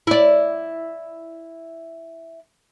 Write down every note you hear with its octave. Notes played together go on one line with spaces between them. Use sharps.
E4 D5